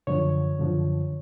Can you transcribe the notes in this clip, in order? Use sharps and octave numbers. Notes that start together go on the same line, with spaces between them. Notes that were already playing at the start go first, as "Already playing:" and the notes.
F#2 D3 F3 C#5
F#2 D3 F3